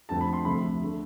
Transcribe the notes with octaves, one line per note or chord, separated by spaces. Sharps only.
F2 D3 A3 A5
B5
C6
D2 C3 F3 A3 B5
D3 A3